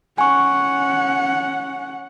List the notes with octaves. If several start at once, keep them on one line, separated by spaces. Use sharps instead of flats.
C#4 F#5 G#5 C#6